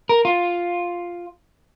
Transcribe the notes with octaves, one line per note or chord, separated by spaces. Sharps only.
A#4
F4